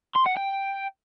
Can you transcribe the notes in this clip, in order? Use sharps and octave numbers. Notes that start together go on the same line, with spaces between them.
C6
F#5
G5